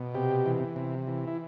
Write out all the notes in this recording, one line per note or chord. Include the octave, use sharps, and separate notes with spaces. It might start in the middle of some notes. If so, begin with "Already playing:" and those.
Already playing: B2
C3 G4
E3
C3
E3
E4